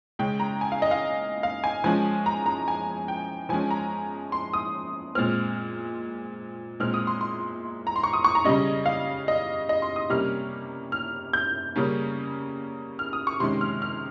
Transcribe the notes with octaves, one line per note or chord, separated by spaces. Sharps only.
C#3 G#3 C#4 G5
A#5
G#5
F5
D#5
F5
F5
G#5
F3 G#3 C#4 G#5
A#5
A#5
G#5
G5
F3 G#3 C#4 G#5
A#5
C6
D#6
A#2 G#3 C4 F6
A#2 G#3 C4 F6
D#6
C6
C6
A#5
C6
C#6
D#6
C#6
A#5
C#3 G3 C#4 D#5
F5
D#5
D#5
C6
D#6
C3 G3 A#3 C#4 F6
F6
G6
C#3 G3 A#3 C#4
F6
D#6
C#6
C3 D#3 G#3 C#4 C6
F6
F6